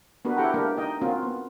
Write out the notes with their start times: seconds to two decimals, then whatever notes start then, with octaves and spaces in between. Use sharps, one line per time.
0.25 B3 D4 F#4 A#4 B4
0.37 E4 G4 A4 F#5 G5 A#5
0.54 G#3 A#3 D4 G4 A#4
0.77 D#4 D#5 G5
1.01 A#3 C4 C#4 F4 F#4 A#4
1.23 B3